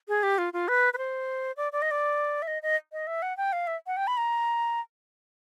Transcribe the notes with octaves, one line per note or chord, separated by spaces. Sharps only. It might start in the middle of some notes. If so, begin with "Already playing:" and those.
G#4
G4
F4
F4
B4
B4
C5
D5
D5
D#5
D5
E5
D#5
D#5
D#5
E5
F#5
G5
F5
E5
F#5
G5
B5
A#5